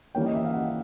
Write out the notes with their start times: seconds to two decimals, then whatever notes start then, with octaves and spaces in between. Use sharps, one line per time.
0.15 E3 G3 A#3 C#4 G5
0.26 D#5
0.35 E5
0.45 F5
0.54 F#5